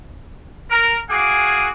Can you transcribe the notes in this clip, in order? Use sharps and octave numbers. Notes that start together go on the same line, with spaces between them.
A#4
F#4 G#4 F5 G#5 D6